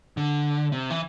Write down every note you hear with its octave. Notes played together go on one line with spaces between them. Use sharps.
D3
C3
E3